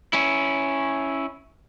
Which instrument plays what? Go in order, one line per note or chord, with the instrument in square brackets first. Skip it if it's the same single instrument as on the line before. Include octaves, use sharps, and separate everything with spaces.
[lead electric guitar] C#4 E4